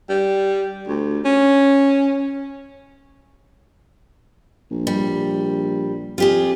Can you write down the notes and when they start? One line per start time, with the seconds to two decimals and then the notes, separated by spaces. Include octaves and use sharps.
0.09 G3
0.88 D2
1.25 C#4
4.71 A#1
4.87 G3
6.18 F2 F4 G4 G#4